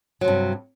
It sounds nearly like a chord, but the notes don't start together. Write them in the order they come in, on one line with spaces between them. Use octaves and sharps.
F#3 C3 G2